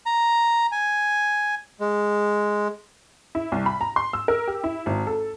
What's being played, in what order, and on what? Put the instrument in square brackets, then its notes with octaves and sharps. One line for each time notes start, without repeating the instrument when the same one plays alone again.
[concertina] A#5
G#5
G#3
[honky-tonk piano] E4
C2
B5
A#5
C6
E6
A#4
G4
E4
G#1
A4